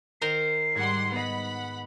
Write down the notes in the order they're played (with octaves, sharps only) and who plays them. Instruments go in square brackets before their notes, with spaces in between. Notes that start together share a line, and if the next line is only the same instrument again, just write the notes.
[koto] D#3 A#4 C5 [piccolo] C7
[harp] G#2 G#6 C#7 [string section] G3 F#5 C6
[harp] B3 D#5 [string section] F#5 B5